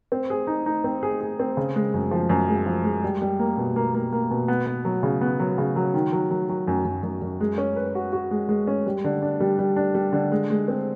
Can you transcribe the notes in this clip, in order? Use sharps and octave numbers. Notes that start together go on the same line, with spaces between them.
C4
G#4
D#4
D#4
C4
G#4
G#4
C4
C#3
G#3
F#2
F3
F#2
G#3
F3
G#3
G3
G3
A#3
B2
A#3
A#3
A#3
B2
B3
B3
F#3
C#3
B3
F#3
C#3
F#3
D#3
F#3
F#3
F#3
F#2
F#2
F#2
F#2
G#3
C#4
B4
F#4
F#4
G#3
G#3
C#4
G3
D3
D4
G3
G3
D4
G3
D3
G#3
G#3
C4